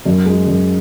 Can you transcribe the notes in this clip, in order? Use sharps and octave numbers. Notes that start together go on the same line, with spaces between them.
F#2
G#3
F#2